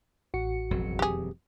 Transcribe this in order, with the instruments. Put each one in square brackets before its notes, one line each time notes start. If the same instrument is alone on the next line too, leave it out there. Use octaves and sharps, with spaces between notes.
[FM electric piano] A1 F#4 C#7
[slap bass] E1 F2 F#3
[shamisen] G4 G#4